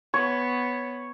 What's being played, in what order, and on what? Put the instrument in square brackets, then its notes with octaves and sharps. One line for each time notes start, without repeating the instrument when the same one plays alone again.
[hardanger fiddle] B3 [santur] C#5